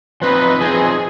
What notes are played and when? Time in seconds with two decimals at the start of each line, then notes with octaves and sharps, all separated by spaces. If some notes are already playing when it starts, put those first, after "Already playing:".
0.22 F3 C4 D#4 B4
0.60 F3 C4 D#4 G#4